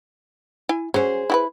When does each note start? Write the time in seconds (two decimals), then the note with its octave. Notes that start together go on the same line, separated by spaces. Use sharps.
0.69 E4 G#5
0.94 F#3 C#4 G#4 C5
1.30 E4 G4 B4